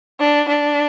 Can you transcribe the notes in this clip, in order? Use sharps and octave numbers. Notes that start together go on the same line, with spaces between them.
D4
D4